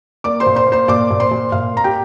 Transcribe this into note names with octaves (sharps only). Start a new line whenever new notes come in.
A#3 D5 D6
C5 C6
A#2
C5 C6
A#3
C5 C6
A#2 D5 D6
A#2
C5 C6
A#2
A#2 F5
A#3 A#5
G4 G5